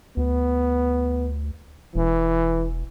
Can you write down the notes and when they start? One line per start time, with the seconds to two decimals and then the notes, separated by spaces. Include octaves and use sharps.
0.17 D2 B3
1.95 E1 E3